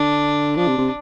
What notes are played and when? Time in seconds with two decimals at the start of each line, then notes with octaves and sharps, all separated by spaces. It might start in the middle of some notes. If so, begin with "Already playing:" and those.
Already playing: D3 D4
0.56 F3 D4
0.68 C3
0.78 C3